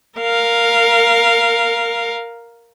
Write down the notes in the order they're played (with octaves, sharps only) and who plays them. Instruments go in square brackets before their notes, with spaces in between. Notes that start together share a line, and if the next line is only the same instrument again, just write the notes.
[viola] A#4 F5